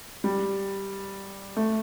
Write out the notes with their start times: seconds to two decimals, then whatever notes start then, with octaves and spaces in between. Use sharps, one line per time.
0.24 G3
1.57 A3